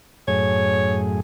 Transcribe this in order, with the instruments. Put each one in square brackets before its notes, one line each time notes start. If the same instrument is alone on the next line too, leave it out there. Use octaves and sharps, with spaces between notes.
[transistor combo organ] F#2 A2 G#4 [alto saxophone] C#5